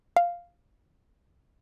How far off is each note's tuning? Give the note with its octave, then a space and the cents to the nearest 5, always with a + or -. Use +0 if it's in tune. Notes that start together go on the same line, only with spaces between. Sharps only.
F5 +0